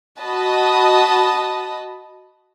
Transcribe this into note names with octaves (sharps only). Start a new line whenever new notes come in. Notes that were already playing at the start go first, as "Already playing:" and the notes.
F#4 D#5 A5 B5 D#6